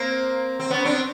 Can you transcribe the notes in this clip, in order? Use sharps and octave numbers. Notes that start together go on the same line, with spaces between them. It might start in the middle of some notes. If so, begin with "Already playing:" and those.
Already playing: A#3 C4
C4
B3 C#4
C4 D4